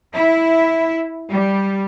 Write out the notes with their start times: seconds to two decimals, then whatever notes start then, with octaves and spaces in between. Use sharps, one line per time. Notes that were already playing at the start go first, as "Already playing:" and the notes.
0.13 E4
1.31 G3